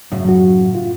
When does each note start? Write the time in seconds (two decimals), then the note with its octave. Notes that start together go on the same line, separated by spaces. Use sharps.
0.12 F#2 A2 C#3
0.25 F#3 F#4
0.75 F4